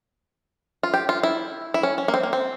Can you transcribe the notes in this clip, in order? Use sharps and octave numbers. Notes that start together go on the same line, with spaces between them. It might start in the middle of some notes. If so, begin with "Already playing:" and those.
F4
G4
F4
E4
E4
C#4
C#4
A#3
C4
A#3
C4